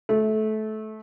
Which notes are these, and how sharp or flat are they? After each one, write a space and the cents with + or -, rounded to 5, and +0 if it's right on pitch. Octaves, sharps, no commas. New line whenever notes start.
A3 -20